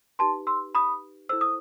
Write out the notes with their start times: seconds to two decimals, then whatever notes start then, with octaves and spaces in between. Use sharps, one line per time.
0.19 D#4 G4 B4 A5 C6
0.47 C6 E6
0.75 B5 D#6
1.29 E4 A4 C5 E6
1.41 D#6